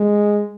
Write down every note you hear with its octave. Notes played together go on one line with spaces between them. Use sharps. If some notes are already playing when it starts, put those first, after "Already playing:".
Already playing: G#3